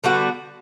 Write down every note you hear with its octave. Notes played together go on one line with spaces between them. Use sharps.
D3 G3 B3 F#4